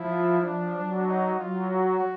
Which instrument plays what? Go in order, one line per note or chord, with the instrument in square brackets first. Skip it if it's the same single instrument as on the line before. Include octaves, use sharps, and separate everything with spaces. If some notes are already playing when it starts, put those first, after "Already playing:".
Already playing: [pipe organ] F3 [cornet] E4
[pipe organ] F3 [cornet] D4
[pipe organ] F#3
[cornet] D#4
[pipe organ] F#3 [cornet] F4
[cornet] F#4